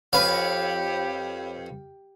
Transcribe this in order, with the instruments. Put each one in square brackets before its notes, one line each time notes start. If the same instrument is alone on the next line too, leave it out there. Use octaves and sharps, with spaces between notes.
[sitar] F2 B4 [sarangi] G4 [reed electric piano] C#5 B5 [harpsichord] F5